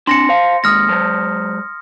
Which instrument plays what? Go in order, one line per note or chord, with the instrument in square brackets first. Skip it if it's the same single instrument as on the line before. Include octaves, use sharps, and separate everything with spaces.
[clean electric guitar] C4 D4 [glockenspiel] C6 A#6 C#7
[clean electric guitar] C5 F5
[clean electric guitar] D#2 G#3 [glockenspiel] D#6 F6 A#6
[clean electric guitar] F#3 G#3 C5